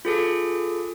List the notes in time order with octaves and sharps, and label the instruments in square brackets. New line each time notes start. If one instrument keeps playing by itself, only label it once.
[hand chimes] F4 G#4 A4